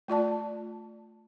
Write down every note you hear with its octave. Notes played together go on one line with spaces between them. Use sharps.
A3 F4 D5 A5